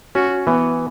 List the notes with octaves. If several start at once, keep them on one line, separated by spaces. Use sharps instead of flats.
C#4 F#4
E3 B3